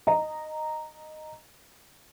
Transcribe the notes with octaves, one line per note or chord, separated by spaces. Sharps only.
D#5 A#5